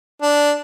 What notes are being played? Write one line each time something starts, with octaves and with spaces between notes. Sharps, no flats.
D4